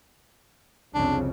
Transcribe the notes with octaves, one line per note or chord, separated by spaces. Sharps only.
C2 F2 C#3 D4